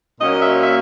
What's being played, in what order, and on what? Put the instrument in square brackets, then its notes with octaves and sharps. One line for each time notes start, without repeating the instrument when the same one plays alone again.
[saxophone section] A#2 F#3 A#3 C#4 D#5
E5
E5